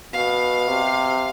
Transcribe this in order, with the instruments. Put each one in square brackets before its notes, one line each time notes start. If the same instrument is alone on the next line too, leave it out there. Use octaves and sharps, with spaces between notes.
[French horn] B2 [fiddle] F5
[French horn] C3